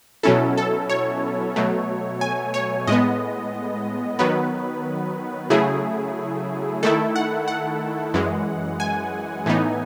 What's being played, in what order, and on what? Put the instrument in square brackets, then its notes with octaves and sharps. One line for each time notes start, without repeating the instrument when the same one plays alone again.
[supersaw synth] B2 F#3 C#4 E4 A4
A4
C#5
B2 F#3 A3
G#5
C#5
A2 G#3 B3 D#5
D#3 F#3 B3 B4
C#3 F#3 A3 E4 G#4
D#3 A3 E4 A4
F#5
F#5
F#2 E3 G#3
G#5
A2 E3 B3 D#4